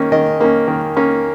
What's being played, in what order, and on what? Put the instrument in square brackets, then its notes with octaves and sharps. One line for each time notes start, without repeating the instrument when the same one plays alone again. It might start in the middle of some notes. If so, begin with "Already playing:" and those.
Already playing: [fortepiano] D#3 A#3 C#4
D#3 D#5
A#3 C#4
D#3
A#3 C#4